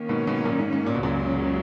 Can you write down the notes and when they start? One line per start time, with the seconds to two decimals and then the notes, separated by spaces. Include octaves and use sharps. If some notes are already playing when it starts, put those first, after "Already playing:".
Already playing: D#3 A#3 C#4
0.09 G#2 B2
0.27 G#2 B2
0.45 F#2 A#2
0.59 G#2
0.73 G#2
0.86 A#2
0.95 B2
1.00 C#2 F#2 A#2 C#3 F#3